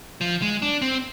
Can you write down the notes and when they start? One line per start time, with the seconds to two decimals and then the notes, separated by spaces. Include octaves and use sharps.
0.21 F3
0.42 G#3
0.62 D4
0.82 C4